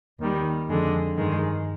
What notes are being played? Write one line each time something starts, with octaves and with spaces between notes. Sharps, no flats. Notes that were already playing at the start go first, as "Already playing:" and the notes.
D#2 D#3 G3
F2 D3 G#3
G2 D#3 G#3